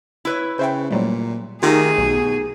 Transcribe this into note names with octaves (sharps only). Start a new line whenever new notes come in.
E4 B4 C#5 E6
C#3 C5 E5 G5
A#2 F#3 G3 A3
D#3 A3 D#4 F4 G4 G#4
B1 B2